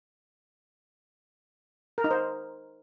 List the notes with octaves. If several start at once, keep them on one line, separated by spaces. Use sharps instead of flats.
A#4
D#4
C5